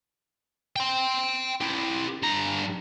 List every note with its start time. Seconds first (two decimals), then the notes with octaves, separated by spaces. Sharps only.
0.76 G5 C6
1.61 E4 G4
2.22 G2 A#5